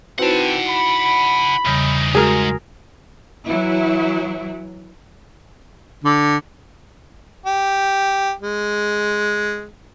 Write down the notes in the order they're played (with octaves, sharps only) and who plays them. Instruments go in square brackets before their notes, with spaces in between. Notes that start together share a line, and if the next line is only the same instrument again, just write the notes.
[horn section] C4 B4 [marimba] D#4 E4 F#4 [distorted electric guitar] F#5 A5
[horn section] B5
[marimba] E2 C#3 G3 [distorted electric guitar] E3 D#4
[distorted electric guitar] D2 G#2 [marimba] G#3 F#4 [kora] G#4 A#4
[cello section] E3 F#3 E4
[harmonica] D3
G4
G#3